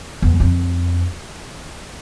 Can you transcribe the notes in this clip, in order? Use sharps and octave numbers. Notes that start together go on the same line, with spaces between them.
E2
F2